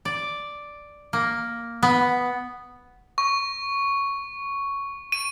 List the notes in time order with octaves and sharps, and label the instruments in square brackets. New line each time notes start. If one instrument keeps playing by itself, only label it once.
[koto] D5
A#3
B3
[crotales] C#6
D#7